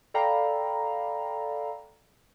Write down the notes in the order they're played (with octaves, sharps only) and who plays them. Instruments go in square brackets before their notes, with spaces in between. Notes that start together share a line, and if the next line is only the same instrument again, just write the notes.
[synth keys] A4 D5 F5 G5 A#5 B5